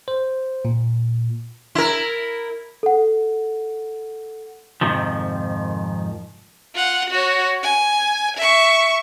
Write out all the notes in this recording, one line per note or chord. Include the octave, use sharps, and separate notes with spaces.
C5
A#2
E4 A#4
A4 F#5
F2 G#2 C3 D#3 F3
F4 F#5
F#4 C#5
G#5
E5 C#6